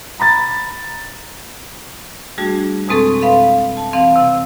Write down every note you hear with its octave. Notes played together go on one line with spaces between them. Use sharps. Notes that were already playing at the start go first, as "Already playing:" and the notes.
A#5 B5 A6
G3 A3 D4 F#4 G#4
F2 B2 G#3 C4 A4 C#6
B4 E5 F5 B5 C6
A5
E3 C4 F5
C3